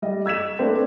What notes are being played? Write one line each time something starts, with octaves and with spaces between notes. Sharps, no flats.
G3 D#5
E6 G#6 B6 E7
A3 A#3 C4 D4 B4 C5